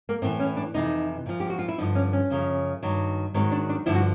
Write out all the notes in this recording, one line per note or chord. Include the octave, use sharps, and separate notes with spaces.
A#3
A2 E3 C4
C#4
D4
F2 C3 E3 D#4
A#2 F3
G4
F#4
F4
E4
G2 D3 F3 D#4
C#4
C#4
F#2 C#3 F3
G2 D#3 F#3
G#2 D#3 F#3 C4
D4
D4
G2 D3 F3 E4
F#4